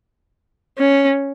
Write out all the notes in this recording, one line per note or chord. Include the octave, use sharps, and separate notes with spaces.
C#4